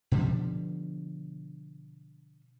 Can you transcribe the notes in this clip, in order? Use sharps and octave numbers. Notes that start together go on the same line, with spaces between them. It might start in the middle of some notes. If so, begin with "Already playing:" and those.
B2 D3 F3 G3